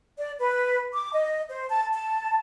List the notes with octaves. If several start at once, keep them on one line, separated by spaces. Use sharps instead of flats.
D5
B4
D6
D#5
C5
A5
A5